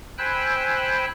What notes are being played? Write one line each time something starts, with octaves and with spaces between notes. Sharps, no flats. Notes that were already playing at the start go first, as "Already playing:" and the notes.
C5 G5 G#5 B5 E6 F#6